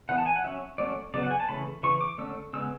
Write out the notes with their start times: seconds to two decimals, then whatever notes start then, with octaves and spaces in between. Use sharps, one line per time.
0.09 E3 B3 F#5
0.18 A5
0.26 G#5
0.36 F#5
0.44 F#3 C#4 E5
0.78 F#3 A3 C#4 D5
1.14 C#3 F#3 B3 D5
1.23 F#5
1.31 G#5
1.40 A5
1.49 C#3 E3 A3 C#4 B5
1.83 C#3 E3 C#6
2.01 D6
2.18 D3 A3 C#4 E6
2.53 C#3 G#3 B3 E6